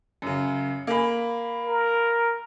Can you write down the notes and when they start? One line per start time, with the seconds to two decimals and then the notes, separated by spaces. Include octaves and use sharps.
0.22 F#2 C#3
0.87 A#3 G#4 B5
1.65 A#4